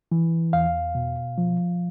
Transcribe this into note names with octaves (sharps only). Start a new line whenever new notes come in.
E3
E2 F5
B2
F3